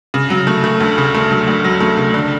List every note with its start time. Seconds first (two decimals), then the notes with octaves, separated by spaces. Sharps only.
0.14 C#3
0.30 F#3
0.47 A3
0.64 A3
0.80 D2
0.98 C#3
1.14 A3
1.31 F#3
1.47 D2
1.64 F#3
1.80 A3
1.97 C#3
2.14 D3